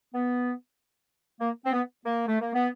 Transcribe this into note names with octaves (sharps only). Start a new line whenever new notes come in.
B3
A#3
C4
B3
A#3
A3
A#3
B3